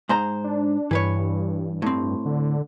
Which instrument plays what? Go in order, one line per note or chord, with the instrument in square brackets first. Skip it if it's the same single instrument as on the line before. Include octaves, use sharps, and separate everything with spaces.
[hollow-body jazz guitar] G#2 C5 A#5
[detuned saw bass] D4
[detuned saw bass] G2 [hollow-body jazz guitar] E3 B4 C#5
[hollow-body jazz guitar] A2 C4
[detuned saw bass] D3